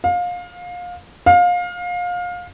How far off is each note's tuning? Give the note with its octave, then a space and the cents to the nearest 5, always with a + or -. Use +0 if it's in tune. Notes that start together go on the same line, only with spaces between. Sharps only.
F5 +25
F5 +25